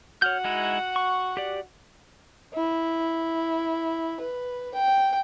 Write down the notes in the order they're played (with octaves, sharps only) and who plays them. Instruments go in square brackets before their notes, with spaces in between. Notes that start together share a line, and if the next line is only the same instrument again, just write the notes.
[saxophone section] F#4 F#5 [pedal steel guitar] C#5 F6 G6
[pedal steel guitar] G#3 D#4 E4
C#6
G4 D5
[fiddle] E4
B4
G5